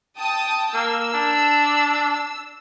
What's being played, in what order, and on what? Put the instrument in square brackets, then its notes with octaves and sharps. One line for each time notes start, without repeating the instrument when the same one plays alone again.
[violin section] G5 A5 D#6
[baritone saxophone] A#3 [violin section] E6
[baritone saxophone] D4